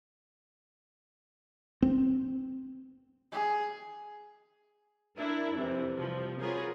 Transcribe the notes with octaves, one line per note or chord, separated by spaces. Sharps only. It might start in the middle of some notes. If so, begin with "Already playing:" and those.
C4
G#4
D4 E4 A#4
F2 C3 E3
C3 F3 G3
F4 F#4 G#4 A#4 B4 C#5